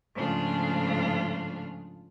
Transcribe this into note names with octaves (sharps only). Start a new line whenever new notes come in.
G#2 C#3 F3 A3 D4 F4